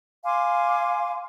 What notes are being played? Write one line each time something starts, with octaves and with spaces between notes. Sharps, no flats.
F5 G#5 C6 D6